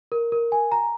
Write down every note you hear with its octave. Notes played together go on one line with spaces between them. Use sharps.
A#4
A#4
G#5
A#5